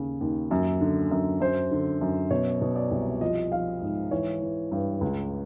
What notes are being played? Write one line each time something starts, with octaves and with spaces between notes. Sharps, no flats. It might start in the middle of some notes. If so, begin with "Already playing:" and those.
Already playing: D#2 C#3
D#2
F#2
D3
F#2
F#2 C5
D3
F#2
B2 C#5
B2
D5
C2
F3 D#5
F3 F5
G#2
E3 C#5
E3
G2
C#2